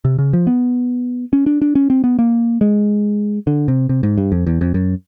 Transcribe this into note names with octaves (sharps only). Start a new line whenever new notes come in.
C3
C#3
F3
B3
C#4
D4
D4
C#4
C4
B3
A#3
G#3
D3
C3
C3
G#2
G2
F2
E2
F2
F#2